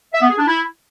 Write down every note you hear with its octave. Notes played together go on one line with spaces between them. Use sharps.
E5
B3
G#4
D4
E4